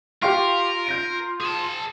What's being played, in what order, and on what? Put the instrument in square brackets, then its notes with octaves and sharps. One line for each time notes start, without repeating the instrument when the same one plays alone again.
[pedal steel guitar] F4 [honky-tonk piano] G4 F5 C#6 [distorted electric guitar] A#4
[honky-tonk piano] G6 A#6 D7
[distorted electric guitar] G#4 A5